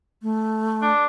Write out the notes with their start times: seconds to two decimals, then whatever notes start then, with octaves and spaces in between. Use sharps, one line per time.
0.22 A3
0.82 D4